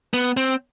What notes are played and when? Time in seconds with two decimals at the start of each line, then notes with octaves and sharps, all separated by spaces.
0.14 B3
0.37 C4